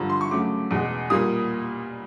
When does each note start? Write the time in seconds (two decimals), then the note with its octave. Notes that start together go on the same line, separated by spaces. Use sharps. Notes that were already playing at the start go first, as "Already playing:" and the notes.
Already playing: G2 D3 F3 A#5
0.10 C6
0.21 C#6
0.30 C#3 F#3 A3 D6
0.71 E2 B2 G#3
1.10 A#2 G3 A#3 D#6